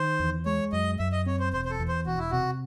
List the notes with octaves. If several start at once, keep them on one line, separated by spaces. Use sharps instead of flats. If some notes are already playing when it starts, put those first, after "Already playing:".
Already playing: D#3 C5
E2
G#3 C#5
F#2 D#5
F#2 E5
D#5
C4 C#5
C5
E1 C5
C5
A4
E2
C5
E1 F#4
E4
C3 F#4